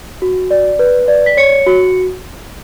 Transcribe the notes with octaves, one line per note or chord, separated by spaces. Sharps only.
F#4
D5
B4
D5
B6
C#5 C#7
F#4